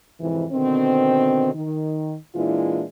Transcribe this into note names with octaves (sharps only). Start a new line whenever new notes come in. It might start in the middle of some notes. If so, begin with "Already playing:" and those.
F2 G#2 C3 E3
B2 D3 D#3 C4
D#3
A#2 E3 G#3 D4 E4 F4